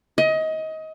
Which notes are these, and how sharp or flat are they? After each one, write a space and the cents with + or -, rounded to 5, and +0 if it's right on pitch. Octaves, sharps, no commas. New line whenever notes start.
D#5 +25